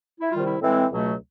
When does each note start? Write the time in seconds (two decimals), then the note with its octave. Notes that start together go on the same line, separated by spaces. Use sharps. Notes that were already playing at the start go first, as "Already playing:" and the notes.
0.21 E4
0.31 C3 D#3 G3 F4
0.46 E4
0.61 A2 E3 G#3 C4
0.91 C#2 B2 F#3 A3